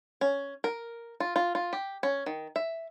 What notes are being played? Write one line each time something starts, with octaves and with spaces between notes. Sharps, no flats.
C#4
A#4
F4
F4
F4
G4
C#4
D#3
E5